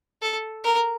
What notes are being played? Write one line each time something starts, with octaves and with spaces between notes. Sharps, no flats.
A4
A#4